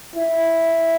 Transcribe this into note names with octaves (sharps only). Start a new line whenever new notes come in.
E4